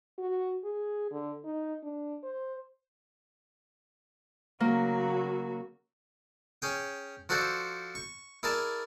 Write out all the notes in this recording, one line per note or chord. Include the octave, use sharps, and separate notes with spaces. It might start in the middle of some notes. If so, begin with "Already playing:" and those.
F#4
G#4
D3
D#4
D4
C5
C#3 F#3 A#3 F#4
C#4 G#4 G5
F3 F#4 A4 C5 D5
C#6
E4 G#4 A#4 D5 A5